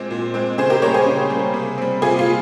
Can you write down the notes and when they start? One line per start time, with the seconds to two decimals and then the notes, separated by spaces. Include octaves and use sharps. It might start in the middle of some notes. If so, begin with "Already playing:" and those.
Already playing: A#2 G#3 C4
0.11 A#2
0.34 G#3 C4
0.58 C#3 G#4 C5
0.70 G4 A#4
0.82 G3 A#3 A#4 C#5
0.94 G#4 C5
1.06 C#3
1.30 G3 A#3
1.54 C3
1.78 G3 C4
2.02 C3 F4 G#4
2.19 F4
2.26 G3